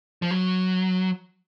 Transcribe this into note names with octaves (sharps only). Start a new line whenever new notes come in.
F3
F#3